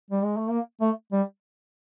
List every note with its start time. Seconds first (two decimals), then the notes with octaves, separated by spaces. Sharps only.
0.10 G3
0.23 G#3
0.37 A3
0.49 A#3
0.80 A3
1.12 G3